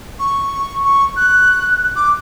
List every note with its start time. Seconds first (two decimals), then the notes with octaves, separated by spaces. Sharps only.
0.19 C#6
0.85 C#6
1.16 F#6
1.96 D6